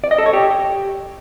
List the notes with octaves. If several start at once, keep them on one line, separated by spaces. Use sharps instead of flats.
D5
D#5
A4
C#5
G4